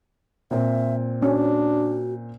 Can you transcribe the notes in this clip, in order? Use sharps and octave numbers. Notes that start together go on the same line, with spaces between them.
A#2 C4 E5
C#4 D4 F#4